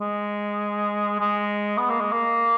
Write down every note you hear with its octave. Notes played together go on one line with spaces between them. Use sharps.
G#3
G#3
B3
A#3
G#3
A#3